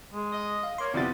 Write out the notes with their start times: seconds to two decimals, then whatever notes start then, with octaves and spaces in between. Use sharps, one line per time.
0.12 G#3
0.32 D#5
0.63 F5
0.78 A#3 C#5 C6
0.94 F2 C3 G3 B3 E4 A6